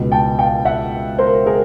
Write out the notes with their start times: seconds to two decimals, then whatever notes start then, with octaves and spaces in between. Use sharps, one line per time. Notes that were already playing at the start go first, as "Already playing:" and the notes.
Already playing: C#2 B2
0.12 G5 A5
0.39 F5 G5
0.65 E5 F#5
1.19 A#4 C5
1.46 G#4 A#4